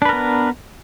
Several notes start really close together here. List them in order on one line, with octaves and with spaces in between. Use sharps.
D4 B4 A#4 B3